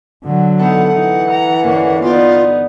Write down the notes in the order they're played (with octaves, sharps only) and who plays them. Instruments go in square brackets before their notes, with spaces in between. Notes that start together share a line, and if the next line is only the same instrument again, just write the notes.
[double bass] D3 F#3
[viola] B3 D#4 [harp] A4 E5 [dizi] F#5
[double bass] E3 [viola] D#4
[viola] A#5
[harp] G1 [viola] A#3 C#4
[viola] B3 D#4 [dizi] F4 [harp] C5 D5